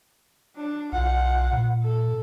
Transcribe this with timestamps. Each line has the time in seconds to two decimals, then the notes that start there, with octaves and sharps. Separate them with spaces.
0.56 D4
0.92 B1 F4 F#5
1.52 A#2
1.83 A4